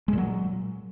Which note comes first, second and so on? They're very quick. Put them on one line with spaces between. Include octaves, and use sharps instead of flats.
G#3 A#2 F#3